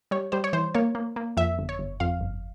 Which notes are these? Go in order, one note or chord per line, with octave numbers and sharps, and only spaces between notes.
G3 C#5
G3 C5
C#5
E3 C5
A#3 C#5
A#3
A#3
F2 E5
G1
C#5
G1
F2 F5
G1